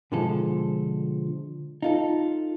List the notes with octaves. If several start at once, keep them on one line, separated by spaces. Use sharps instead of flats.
B2 D3 F3 G#3 A4
D#4 F4 A4